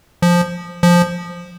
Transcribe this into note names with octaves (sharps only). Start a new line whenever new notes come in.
F3
F3